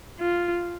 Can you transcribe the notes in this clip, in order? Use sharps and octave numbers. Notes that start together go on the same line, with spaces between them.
F4